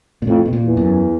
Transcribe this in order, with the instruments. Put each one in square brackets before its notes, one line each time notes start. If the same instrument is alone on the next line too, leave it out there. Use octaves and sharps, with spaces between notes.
[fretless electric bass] A#2
[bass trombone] F2 [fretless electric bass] A2
[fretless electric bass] B2
A#2
[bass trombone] E2
[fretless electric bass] F#2